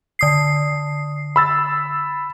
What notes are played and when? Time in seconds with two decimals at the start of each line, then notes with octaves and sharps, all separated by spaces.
0.19 D3 D#6 C7
1.36 B5 E6 A6